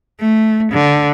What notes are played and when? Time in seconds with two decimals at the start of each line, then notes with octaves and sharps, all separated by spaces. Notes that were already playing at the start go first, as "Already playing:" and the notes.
0.20 A3
0.73 D3